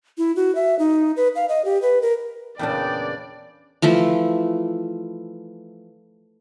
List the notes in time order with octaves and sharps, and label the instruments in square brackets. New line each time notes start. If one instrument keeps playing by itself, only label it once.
[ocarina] E4
F#4
E5
D#4
B4
F5
D#5
G4
B4
A#4
[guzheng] E2 A#2 C#3 [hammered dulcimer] B3 D4 [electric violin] D5 [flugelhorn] G5
[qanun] E3 F3 A3 E5